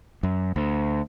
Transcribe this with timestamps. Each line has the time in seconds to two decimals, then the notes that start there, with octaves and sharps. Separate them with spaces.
0.23 F#2
0.56 D2